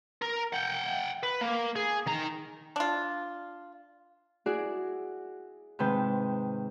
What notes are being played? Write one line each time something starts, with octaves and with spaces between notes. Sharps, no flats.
A#4
F#5 G5
B4
A#3
G#4
D#3 A#5
D4 F4
E4 F#4 G#4 D5 D6
G#2 C3 D#3 B4 G5